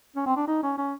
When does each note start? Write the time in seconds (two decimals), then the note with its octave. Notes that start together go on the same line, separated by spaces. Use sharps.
0.16 C#4
0.26 C4
0.37 D4
0.47 D#4
0.63 C#4
0.78 C#4